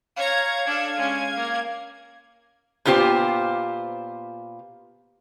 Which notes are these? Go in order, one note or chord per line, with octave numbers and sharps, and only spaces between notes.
C#5 F5 A#5 G#6
D4 A4
G#3 C#4
A#3
A#2 B3 F4 G4 C5